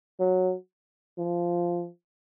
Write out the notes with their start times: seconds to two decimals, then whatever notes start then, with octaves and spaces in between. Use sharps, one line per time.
0.19 F#3
1.18 F3